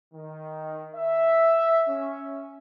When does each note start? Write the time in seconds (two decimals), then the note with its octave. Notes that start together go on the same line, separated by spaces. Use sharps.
0.14 D#3
0.95 E5
1.89 C#4